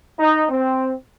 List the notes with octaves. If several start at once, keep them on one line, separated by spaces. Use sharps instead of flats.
D#4
C4